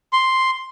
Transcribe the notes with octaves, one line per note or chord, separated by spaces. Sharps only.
C6